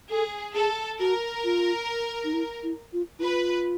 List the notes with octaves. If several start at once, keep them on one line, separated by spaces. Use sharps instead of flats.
G#4 A4
G#4 A4
F#4 A#4
F4
D#4
E4
E4
F4
E4
F4 B4